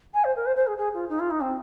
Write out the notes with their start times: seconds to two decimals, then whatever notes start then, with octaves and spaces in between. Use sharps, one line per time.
0.13 G#5
0.24 C5
0.36 A#4
0.46 C5
0.56 C5
0.66 G#4
0.77 G#4
0.93 F4
1.09 D#4
1.19 F4
1.30 D#4
1.40 C4